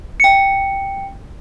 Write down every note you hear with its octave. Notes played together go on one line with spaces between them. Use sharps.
G5 C#7